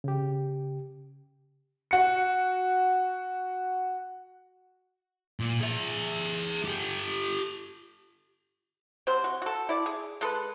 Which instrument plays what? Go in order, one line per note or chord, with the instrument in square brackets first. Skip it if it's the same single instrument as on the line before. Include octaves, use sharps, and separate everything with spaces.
[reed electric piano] C#3 G4
[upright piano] F#4 C#7
[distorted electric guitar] A#2
G#4 E5
G4 A4
[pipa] C3 F#3 C4 C5
F#4
F#4 A4
E4 D5
G#4
G#3 A4 B4